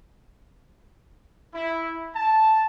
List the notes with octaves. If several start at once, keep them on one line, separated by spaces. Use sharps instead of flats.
E4
A5